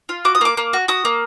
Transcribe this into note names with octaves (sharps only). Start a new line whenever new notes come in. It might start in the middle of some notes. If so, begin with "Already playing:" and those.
F4
F#4 D6
D#6
A#3 D6
A#3
F#4
F#4 D#6
A#3